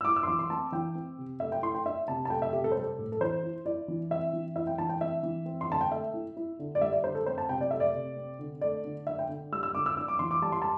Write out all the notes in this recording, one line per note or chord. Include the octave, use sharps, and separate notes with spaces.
E6
E4 D6
E6
C6
E3 D6
C6
C4 A5
E3 G5
C4
C3
A3 E5
G5
E4 C6
G5
D4 E5
C3 A5
A5
A3 G5
E5
C3 G4
A4
C5
G3 A4
A2
A4
E3 C5
E4
E4 D5
E3
C4 E5
E3
E4 E5
G5
E3 A5
G5
C4 E5
E3
C4
C6
D3 A5
G5
A3 E5
E4
E4
D3
D5
G3 E5
D5
D3 C5
A4
C4 C5
A5
C3 G5
D5
A3 E5
D5
C3
C4
D3
A3 D5
D3
D4 E5
G5
D3
G3 E6
E6
D3 D6
E6
D4 E6
D6
E3 C6
D6
G3 A5
C6
A5